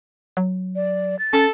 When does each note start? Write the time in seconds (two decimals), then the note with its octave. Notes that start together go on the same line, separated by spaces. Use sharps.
0.37 F#3
0.76 D5
1.19 A6
1.33 C#4 A4